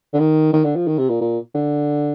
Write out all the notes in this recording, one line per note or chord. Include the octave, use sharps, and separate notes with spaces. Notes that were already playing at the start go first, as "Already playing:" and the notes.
D3
D#3
D#3
D3
F3
D#3
C3
A#2
A#2
D3